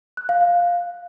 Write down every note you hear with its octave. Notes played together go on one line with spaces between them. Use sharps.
F#6
F5
F5